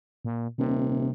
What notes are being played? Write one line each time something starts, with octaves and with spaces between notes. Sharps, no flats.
A#2
D#1 C3